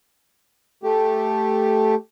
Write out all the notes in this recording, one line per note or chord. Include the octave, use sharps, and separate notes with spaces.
A3 G4